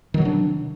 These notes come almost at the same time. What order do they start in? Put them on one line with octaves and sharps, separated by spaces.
D#3 F#3 C3 D4